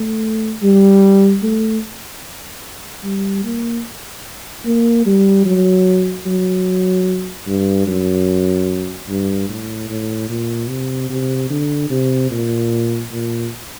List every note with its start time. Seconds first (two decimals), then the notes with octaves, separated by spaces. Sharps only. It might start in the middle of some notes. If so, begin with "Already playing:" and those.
Already playing: A3
0.62 G3
1.43 A3
3.04 G3
3.44 A#3
4.65 A#3
5.06 G3
5.45 F#3
6.26 F#3
7.47 G2
7.87 F#2
9.08 G2
9.49 A2
9.89 A2
10.29 A#2
10.69 C3
11.09 C3
11.50 D3
11.90 C3
12.31 A#2
13.11 A#2